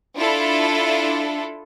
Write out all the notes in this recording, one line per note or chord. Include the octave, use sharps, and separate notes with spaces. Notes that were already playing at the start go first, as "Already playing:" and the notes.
D4 E4 F4 A4